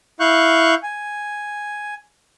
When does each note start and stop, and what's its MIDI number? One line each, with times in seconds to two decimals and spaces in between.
0.20 0.75 64
0.20 0.75 77
0.20 0.75 85
0.20 0.75 90
0.20 0.75 91
0.83 1.94 80